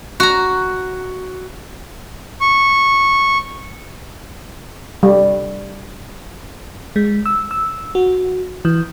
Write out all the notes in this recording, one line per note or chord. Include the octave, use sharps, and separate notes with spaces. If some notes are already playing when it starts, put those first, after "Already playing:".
F#4 A#5
C#6
G3
G#3
E6
E6
F#4
E3